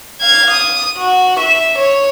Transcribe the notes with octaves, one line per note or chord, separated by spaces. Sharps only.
F5 G#6
D#6
F#4
E5
C#5